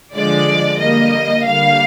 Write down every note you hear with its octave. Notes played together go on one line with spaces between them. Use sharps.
D3 F3 G#3 D5
D3 G3 A#3 D#5
D3 G3 A#3 F5